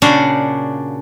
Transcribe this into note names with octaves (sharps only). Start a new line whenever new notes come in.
A#2 C#3 D4 F#4 F5